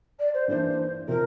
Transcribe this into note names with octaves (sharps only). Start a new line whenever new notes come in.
D5
C5
G2 E3 A#3 D4 C5
C3 F3 A#4